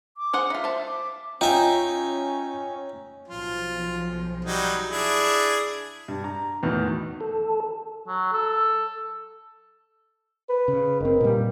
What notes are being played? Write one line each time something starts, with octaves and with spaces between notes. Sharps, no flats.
D6
G#4 C5 F#5
D#4 F4 E5
C5 A5
D6
C#4 D#4 F4 E5 G5 G#5
B1 F3 F4
F#3 G3 D#4
D4 E4 G#4
G2
A#5
B1 E2 A2 D#3 E3
A4
F#3
A4
B4
C#3
F#1 D#3 C4
A#2 G3